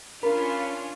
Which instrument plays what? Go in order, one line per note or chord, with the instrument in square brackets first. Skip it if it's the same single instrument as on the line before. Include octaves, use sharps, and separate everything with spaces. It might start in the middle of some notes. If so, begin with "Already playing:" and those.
[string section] C#4 D4 F4 [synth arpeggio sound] A#4 [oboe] B5